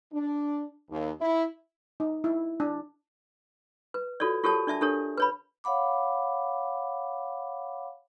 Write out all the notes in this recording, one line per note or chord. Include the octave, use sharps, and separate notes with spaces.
D4
D#2
E4
D#4
E4
D4
B4
F4 F#4 A4 C#5 D5
F4 G4 A4 A#4 C#5 A5
D4 D5 E5 A5
D4 G4 A4 A#4 C#5
B4 C#5 B5
C#5 F5 F#5 B5 D6